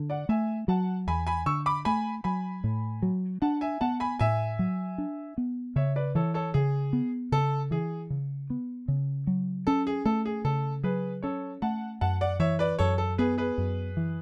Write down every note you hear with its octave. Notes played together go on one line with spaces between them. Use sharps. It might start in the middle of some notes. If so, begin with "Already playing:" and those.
Already playing: D3
D5 F#5
A3 E5 G#5
F#3 F#5 A5
E2 G#5 B5
G#5 B5
D3 C#6 E6
B5 D6
A3 G#5 B5
F#3 G#5 B5
A2
F#3
D4 F#5 A5
E5 G#5
B3 F#5 A5
G#5 B5
A2 E5 G#5
F#3
D4
B3
C#3 C#5 E5
B4 D5
E3 A4 C#5
A4 C#5
C#3 G#4
B3
C#3 A4
E3 G#4
C#3
B3
C#3
F#3
C#4 A4
G#4
A3 A4
G#4
C#3 A4
F#3 G#4 B4
C#4 A4 C#5
A3 F#5 A5
F#2 F#5 A5
D5 F#5
E3 C#5 E5
B4 D5
F#2 A4 C#5
A4
B3 G#4 B4
G#4 B4
F#2
E3